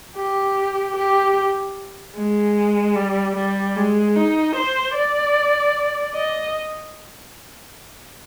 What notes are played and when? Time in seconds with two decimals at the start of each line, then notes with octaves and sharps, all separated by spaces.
0.16 G4
0.96 G4
2.16 G#3
2.96 G3
3.36 G3
3.76 G#3
4.16 D#4
4.56 C5
4.95 D5
6.15 D#5